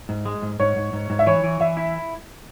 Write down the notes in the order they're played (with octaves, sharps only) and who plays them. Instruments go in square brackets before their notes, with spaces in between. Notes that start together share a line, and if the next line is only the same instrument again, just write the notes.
[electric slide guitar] G#2
G#3
G#2
[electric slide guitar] G#2 [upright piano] C#5
[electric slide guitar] G#2
G#2
G#2
[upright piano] E5
[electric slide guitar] E3 [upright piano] C#5
[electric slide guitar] E3
[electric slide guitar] E3 [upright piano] E5
[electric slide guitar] E4